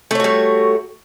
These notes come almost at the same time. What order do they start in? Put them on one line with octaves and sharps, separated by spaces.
A3 C#5 F#4 G3